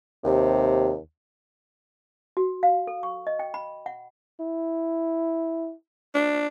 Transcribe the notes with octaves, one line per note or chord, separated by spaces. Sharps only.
D#2 C3
F#4
F5
A4
C#6
D#5
G5
B5
F#5
E4
D4